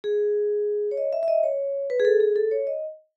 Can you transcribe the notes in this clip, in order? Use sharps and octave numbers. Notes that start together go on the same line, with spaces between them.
G#4
C#5
D#5
E5
E5
D#5
C#5
B4
G#4
A4
G#4
A4
C#5
D#5